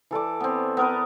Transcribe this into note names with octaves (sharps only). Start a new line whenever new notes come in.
E3 A4 D5 D6
B3 C4
B3 A#4 B4